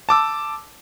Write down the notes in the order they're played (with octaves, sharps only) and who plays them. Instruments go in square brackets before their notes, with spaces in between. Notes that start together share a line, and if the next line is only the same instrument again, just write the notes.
[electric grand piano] A5 D6 E6